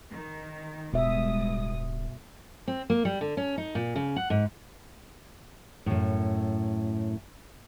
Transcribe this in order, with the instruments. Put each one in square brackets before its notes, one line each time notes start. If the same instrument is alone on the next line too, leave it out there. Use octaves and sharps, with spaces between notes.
[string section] D#3
[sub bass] D1 [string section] G2 G#3 D#6 [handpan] B2 E5
[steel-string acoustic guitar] C4
A#3
G3
D3
C#4
D#4
A#2
C#3
F#5
G#2
F#2 A2